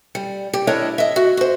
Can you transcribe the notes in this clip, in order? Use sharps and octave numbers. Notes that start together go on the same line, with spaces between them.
G3
G4
D4 E4 A#4 C#5 D#5
D#5 E5
F#4
F#4 C5